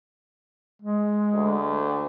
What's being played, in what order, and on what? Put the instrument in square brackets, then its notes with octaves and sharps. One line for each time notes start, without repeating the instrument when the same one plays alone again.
[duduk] G#3
[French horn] D2